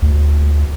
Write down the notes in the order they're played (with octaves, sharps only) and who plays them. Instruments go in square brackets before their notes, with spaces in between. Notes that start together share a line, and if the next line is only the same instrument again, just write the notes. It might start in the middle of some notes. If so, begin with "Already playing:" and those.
[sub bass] D2